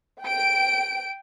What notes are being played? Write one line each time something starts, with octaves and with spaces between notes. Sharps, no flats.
G5 D7